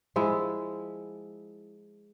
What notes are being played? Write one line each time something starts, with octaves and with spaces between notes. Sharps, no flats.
F3 G#3 E4